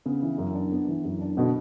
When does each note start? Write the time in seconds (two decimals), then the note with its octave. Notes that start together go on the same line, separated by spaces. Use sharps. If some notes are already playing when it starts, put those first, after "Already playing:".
0.06 C#3 B3
0.22 E3
0.38 F#2
0.54 D4
0.72 B3
0.88 E3
1.05 F#2
1.21 D4
1.37 B2 D3 B3